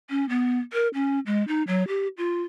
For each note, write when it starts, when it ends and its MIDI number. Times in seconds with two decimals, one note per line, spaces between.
0.10 0.27 61
0.29 0.58 59
0.73 0.88 70
0.94 1.19 61
1.26 1.46 56
1.48 1.63 63
1.67 1.86 54
1.88 2.08 67
2.18 2.42 65